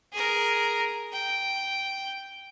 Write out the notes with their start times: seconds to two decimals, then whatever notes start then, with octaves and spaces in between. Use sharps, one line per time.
0.13 G#4 A#4
1.13 G5